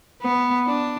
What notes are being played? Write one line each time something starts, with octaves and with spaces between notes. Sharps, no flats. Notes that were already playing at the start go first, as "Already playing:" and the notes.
B3
D4